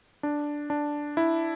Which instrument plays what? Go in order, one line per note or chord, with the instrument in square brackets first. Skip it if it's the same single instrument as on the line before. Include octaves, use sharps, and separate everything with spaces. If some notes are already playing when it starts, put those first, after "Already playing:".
[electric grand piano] D4
D4
E4